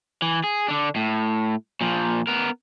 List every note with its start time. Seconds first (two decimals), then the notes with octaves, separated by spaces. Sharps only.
0.22 E3
0.44 G#4
0.68 D3 D4
0.96 A2
1.81 A#2 F3
2.27 B3 A#4